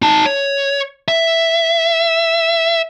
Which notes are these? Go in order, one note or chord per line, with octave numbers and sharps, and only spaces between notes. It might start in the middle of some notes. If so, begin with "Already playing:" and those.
D#4 A5
C#5
E5